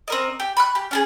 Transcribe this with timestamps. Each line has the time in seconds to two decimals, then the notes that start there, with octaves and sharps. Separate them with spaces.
0.08 C4 A#4 D#5
0.40 G4
0.57 B5 C#6 F#6
0.75 G4
0.91 C#4 D4 G#4